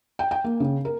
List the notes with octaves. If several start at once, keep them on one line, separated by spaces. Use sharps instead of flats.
G5
G5
A#3
C#3
A#4